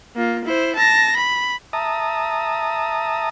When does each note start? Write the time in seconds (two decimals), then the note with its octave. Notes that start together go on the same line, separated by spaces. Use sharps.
0.16 A#3 F4
0.45 E4 C5
0.75 A5 A#6
1.16 B5
1.73 E5 A5 A#5 D#6